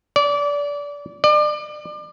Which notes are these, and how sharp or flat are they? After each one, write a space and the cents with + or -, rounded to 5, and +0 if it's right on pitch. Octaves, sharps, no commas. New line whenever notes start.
D5 -25
D5 +35